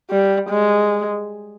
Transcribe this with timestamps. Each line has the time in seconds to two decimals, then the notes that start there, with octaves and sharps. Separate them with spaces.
0.10 G3
0.49 G#3